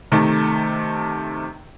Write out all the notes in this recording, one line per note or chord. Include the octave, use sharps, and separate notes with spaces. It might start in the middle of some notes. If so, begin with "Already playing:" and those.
C3 D#3 A3